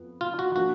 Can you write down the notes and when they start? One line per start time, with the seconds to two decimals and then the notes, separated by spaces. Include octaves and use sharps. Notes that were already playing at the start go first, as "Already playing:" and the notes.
Already playing: F2 B3
0.21 F4
0.39 F#4
0.56 F3 A#3 D4 F4 F#4